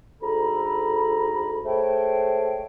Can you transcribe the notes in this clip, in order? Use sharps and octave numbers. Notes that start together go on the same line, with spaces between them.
D2 G#2 A4 A#5 B5
G#3 A3 C5 C#5 G5